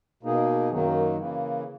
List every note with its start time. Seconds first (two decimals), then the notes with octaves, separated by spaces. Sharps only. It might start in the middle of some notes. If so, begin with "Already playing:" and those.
0.23 B2 A#3 D#4 G#4
0.70 F#2 D#3 F#3 A#3 D#4
1.17 C#3 E3 A#3